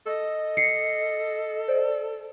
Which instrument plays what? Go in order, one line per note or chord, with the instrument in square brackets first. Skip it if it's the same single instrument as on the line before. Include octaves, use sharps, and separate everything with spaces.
[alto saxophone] A4 [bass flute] D#5
[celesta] C7 C#7
[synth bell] C5 D5